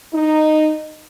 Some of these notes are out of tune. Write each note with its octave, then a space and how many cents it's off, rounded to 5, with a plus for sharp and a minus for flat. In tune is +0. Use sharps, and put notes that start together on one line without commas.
D#4 -10